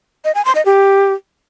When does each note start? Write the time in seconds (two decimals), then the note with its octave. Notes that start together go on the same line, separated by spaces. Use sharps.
0.25 D#5
0.35 G#5
0.45 C6
0.55 D#5
0.65 G4